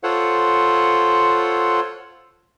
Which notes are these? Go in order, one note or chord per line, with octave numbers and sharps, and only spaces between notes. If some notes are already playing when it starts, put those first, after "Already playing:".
F4 A4 C5 C#5 F#5